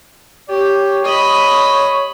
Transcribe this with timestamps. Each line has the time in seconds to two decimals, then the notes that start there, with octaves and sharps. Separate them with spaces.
0.49 G4 C#5
1.04 D#5 B5